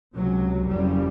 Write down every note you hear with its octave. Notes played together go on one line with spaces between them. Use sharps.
C#2 C3 F#3
F#1 F2 C#3 G3